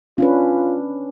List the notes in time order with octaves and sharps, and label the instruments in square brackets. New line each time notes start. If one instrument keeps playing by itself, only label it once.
[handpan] C#4 D4 B4 [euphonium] F4